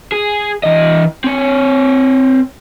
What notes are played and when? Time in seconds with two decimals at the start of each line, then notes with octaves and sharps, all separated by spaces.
0.12 G#4
0.63 E3 D#5
1.24 C4 C#5